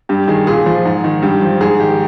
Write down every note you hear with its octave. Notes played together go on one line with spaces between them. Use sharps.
G2 G4
D#3 G#4
A#2 G#4
F3
G#2
D#3
G2 G4
F3
G#2 G#4
D#3 G4